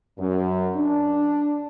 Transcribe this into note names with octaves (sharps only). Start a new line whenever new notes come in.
F#2
D4